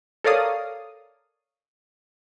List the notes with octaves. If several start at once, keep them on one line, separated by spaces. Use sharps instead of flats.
A4 A#4 C#5 D5 F5 D#6